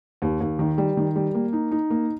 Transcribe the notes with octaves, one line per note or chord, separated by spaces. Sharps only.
D#2
D#2
D#3
G3
D#3
G3
A#3
D#4
D#4
A#3